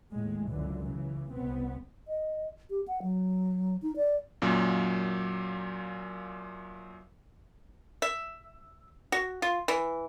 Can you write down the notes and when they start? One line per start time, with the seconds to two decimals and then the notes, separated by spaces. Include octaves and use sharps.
0.12 D#2 A2 G#3
0.48 C#2 F#2 D3 E3
0.85 C#3 E3
1.32 C2 B3 C4
2.08 D#5
2.70 G4
2.88 F#5
3.02 F#3
3.82 D#4
3.96 D5
4.42 F#2 A#2 F#3 A#3
8.02 E5
9.12 F#4
9.42 F4
9.68 E3